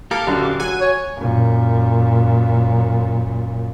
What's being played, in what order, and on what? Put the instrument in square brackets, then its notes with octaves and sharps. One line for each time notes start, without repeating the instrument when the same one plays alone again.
[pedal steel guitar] A#3 A4 A#4 [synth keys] G4 F5
[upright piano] D#1 F#2 D3 [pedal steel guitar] D4 F#4
[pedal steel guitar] D6
[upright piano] F#3 [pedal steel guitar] F#5 [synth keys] G#5
[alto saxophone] C#5
[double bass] F#2 A#2